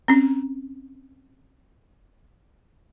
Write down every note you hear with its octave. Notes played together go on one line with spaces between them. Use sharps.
C4 C#4